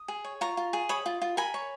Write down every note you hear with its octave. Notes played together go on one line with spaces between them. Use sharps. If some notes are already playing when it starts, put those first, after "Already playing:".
Already playing: D#6
G#4
C#5
F4 A#5 C#6
F4
G#4
C#5 B5 D#6
F4
F4
A#4 G#5 B5
C#5